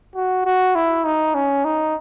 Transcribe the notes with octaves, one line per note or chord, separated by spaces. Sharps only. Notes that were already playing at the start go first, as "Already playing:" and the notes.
F#4
F#4
E4
D#4
C#4
D#4